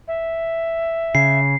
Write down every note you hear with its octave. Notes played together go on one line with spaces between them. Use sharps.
E5
C#3 C7